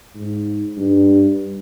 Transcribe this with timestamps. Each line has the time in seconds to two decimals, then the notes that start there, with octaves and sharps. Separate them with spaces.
0.16 G#2
0.78 G2